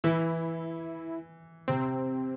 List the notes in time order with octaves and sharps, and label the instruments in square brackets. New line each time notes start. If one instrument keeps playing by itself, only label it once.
[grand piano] E3 [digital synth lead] E4
[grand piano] C3 [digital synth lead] C4